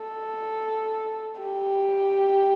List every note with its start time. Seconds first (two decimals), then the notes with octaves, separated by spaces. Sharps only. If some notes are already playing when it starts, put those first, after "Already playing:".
Already playing: A4
1.40 G4